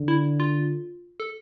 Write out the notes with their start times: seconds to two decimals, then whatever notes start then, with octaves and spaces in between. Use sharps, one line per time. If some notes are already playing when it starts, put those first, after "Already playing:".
Already playing: D3
0.08 E4
0.40 F4
1.20 A4